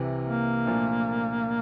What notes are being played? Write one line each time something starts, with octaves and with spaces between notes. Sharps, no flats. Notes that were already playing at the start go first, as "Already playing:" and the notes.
Already playing: C2 C3 E3
A#3
C2 A#2 F3 A3 D4